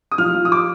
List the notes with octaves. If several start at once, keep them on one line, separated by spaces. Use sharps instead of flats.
D#6
F3 F6
F3
D#6
D6